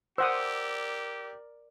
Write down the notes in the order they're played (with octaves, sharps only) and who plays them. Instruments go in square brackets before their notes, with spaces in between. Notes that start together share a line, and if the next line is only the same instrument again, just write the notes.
[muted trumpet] G4 [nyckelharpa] A#4 D5 [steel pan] C5 F#5 D#6 [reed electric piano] E6